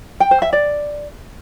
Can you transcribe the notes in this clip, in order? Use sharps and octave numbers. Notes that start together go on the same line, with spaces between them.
G5
C5
E5
D5